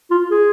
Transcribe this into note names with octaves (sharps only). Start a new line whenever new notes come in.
F4
G#4